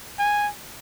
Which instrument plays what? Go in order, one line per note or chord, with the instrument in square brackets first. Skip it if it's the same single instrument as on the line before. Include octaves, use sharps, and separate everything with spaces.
[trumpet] G#5